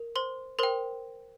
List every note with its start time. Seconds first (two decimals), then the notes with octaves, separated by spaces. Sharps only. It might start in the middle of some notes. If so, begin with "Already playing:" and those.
Already playing: A#4
0.16 C5 C6
0.59 A#4 C5 G5 C6